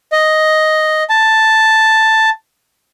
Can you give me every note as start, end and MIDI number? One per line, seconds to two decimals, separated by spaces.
0.12 1.03 75
1.09 2.30 81